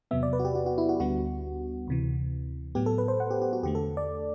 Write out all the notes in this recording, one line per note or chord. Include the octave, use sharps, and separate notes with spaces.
E2 C3 F#3 B3 E5
D5
B4
F#4
G4
F#4
F#4
E4
F#4
D2 D3 G3 B3 F#4
D2 C3 E3
A2 F#3 B3 G4
A4
B4
C5
F#5
G4
G4
F#4
E2 D3 A3 G4
A4
D5